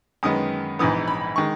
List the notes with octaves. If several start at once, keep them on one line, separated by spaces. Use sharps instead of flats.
F#2 D#3 G#3 B3 D#6
A#1 G#2 E3 B3 D#6
B5
D#3 G#3 C#6